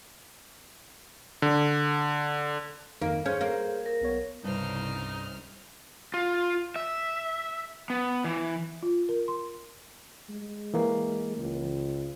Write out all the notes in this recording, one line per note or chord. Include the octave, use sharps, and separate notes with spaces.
D3
F2 D#3 A#3 D#4
C#4 G#4 C5 G6
A#3
A#4
B1 B3 C#5
C2 G2 C#3 D#4 C5 F6
F4
E5
B3
E3
F4
A#4
C6
G#3
E3 A#3
C#2